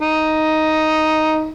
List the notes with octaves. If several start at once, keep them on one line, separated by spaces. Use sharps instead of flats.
D#4